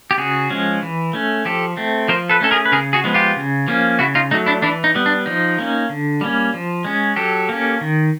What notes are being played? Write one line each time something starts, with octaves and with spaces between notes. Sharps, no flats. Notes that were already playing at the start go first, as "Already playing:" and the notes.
G4
C#3 F#4 G#4
F3 G#3 C#4
E3
A3 C#4
F3 G4 A4
A3 C4
F3 A#4 C5
A4 B4
A3 C#4 A4
G#4 A#4
B4
C#3 G#4 A#4
F#4 G#4
F3 G#3 B3
F4 G4
C#3
F3 A#3 C#4
C#3 E4 F#4
D#4 F4
F#3 A3 D#4
D4 E4
E3 D4 E4
D#4
G3 B3
D4
F3 D#4
A#3 C#4
D3
G3 A#3 C#4
F3
G#3 C#4
F#3 G4 A4
A#3 C#4
D#3